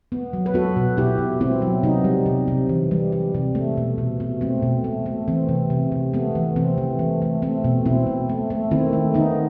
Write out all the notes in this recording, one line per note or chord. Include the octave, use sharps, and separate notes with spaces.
B3
F#3
B4
B3 F#4 A4
B2
B2 E4 G4
B2
B2 C4 E4
F#3
C3 B3 D#4
G3
C3
C3
E3
G3
G3
C3
A3
B2
B2
B2
A3 C4
B2
A3
A3
E3 C4
C3
C3
C3
A3 B3
E3
C3 C4
E3
A3
A3
A3 C4
B2
B2 C4 E4
B2
A3
A3
D#3 C4 E4
A3
D#3 B3 D#4